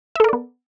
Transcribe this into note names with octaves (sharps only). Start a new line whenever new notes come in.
B3 A4 A#4 D5 E5